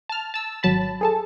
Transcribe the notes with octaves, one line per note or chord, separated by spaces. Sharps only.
A5 F6
A5 E6
G#1 F#3 A5 B5
G#4 A4 A5